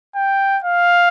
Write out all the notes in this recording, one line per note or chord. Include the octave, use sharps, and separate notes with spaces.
G5
F5